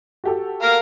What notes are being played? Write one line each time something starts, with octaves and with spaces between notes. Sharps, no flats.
F#4 G4 A4
A#4 F5